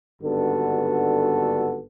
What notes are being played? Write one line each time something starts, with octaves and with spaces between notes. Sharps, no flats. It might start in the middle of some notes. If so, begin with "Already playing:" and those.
G#1 G2 D3 B3 F#4 A4